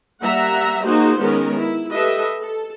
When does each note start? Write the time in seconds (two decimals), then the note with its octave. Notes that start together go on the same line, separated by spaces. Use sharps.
0.23 G3 A#3 E5 F#5 A#5
0.85 A#3 D#4 F4 F#4 G#4 C5
1.20 D#3 G#3 B3 C#4 A#4
1.58 E4
1.91 G4 A4 B4 D#5 E5
2.41 A4